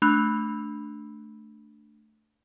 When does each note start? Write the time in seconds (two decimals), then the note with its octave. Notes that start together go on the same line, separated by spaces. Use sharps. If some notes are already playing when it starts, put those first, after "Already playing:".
0.02 A3 D4 B5 E6 F#6 F7